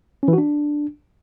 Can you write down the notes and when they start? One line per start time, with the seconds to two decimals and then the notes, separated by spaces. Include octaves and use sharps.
0.23 C#4
0.28 E3
0.33 F#4
0.38 D4